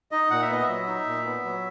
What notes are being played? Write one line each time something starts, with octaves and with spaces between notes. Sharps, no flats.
D#4 D#5
A#2 F#5
E5
B3 D#5
E5
F#3
D#4
A#2
B3
F#3